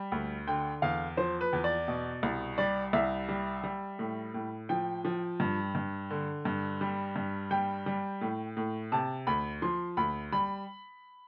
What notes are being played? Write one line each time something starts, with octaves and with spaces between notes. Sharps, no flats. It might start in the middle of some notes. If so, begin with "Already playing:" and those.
Already playing: G3
D2
D3 G5
E2 F5
F3 C5
B4
E2
D5
B2
C2
G3 D5
C2 E5
G3
G3
A2
A2
F3 G5
F3
G2
G2
D3
G2
G3
G2
G3 G5
G3
A2
A2
C3 A5
D2 B5
F3 C6
D2 B5
G3 B5